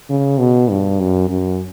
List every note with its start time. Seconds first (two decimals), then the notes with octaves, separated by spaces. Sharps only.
0.10 C#3
0.40 B2
0.70 G2
1.00 F#2
1.29 F#2